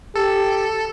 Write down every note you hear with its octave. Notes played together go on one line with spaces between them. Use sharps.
G4 A4